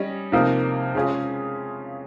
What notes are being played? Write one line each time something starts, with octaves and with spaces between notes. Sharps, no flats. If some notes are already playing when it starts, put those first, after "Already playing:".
Already playing: G3 C#4 D#5
C3 F3 A#3 D#4
C#3 G#3 C#4 F4 G#4